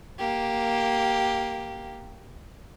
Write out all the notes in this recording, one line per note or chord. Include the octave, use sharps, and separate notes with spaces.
A#3 G4